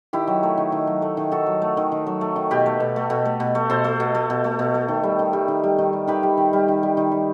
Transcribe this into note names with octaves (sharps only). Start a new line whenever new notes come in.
D#3 E4 G4
F#3
A3
D#3
D#3
F#3
A3
D#3
D#3 F#4 A4
F#3
A3
D#3
D#3
F#3
A3
D#3
B2 G4 B4
A3
B2
A3
B2
A3
B2
A3
B2 A4 C5
A3
B2
A3
B2
A3
B2
A3
D#3
G3
D#3
G3
D#3
G3
D#3
G3
D#3 G4 B4
G3
D#3
G3
D#3
G3
D#3
G3